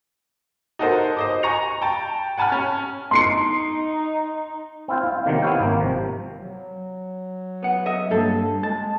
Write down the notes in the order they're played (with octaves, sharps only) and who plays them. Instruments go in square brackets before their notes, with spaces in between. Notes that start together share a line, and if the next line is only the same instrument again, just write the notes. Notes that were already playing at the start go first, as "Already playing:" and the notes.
[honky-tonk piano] D#4 F#4 A4 A#4 C5
C5 D#5 D6
G#5 A#5 C#6 A#6 C#7 F7
G5 A5
F#5 G#5 A5 B5 F6
C#4
[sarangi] D#4 [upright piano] C6 C7 C#7
[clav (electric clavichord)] C4 E4 F4 C5
F5
C3 D#3 F3 F#3 A#3
B3 C4 E4 C#5 F5 G5
G#1 A#3
C3 F3
[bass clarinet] F#3
[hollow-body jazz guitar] B3 F#5
D#5 E5
[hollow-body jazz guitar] G2 A4 [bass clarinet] A#3
[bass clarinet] G#3 [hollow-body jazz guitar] A5